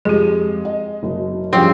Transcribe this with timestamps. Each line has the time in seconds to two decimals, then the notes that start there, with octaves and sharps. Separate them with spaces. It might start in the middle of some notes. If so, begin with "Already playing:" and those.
0.05 F2 G#3 G4 G#4
0.65 D#5
1.03 F#1 B2
1.53 G2 F3 C4 C#4 F4 G4 G#4 G5